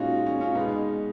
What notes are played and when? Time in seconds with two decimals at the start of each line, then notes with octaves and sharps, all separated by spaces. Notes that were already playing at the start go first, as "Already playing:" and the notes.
Already playing: A#2 G#3 C#4 D#4 F4 F#4
0.26 C#4
0.40 C#4 F4
0.55 B2 G#3 B3 D#4